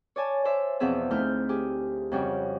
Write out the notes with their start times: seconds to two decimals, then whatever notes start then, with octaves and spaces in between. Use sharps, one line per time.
0.16 C#5 D5 G#5 A5
0.45 C5 D5 E5
0.80 E2 B2 F3 C4 G#4 E5
1.11 D2 A3 D#4 E4 F6 G6
1.49 G4 G#4
2.12 F2 C#3 G3 F#4 G5